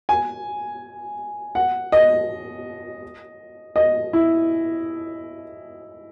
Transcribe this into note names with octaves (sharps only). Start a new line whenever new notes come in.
G#5
F#5
D#5
D#5
E4